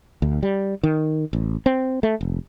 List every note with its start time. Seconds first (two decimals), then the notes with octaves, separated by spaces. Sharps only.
0.22 D2
0.43 G3
0.83 D#3
1.33 A1
1.66 C4
2.03 A3
2.21 F1